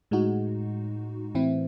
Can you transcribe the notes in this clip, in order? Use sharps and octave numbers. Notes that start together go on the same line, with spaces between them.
A2 G#3 D#4 F#4
A2 E3 C4 E4